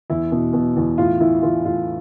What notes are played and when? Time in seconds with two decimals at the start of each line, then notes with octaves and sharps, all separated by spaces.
0.10 E2 E4
0.32 B2
0.53 B2
0.76 E2
0.98 A2 F4
1.20 E3 E4
1.42 E3 F4
1.65 A2 F4